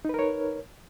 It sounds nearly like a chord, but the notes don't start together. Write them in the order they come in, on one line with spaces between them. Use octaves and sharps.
D#4 B4 A#4 C#5